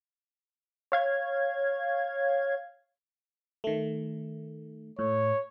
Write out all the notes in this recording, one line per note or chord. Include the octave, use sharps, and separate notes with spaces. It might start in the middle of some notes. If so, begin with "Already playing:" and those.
C#5 F5 G#6
D#3 A3
A2 C#5